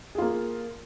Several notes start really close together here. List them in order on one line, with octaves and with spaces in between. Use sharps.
G#4 F4 A#3